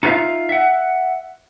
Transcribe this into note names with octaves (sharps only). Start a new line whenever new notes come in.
D#4 F4 A4 C5 E5 F5
E5 F#5